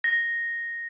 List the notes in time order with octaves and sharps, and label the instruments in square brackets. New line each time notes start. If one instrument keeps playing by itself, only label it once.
[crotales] A#6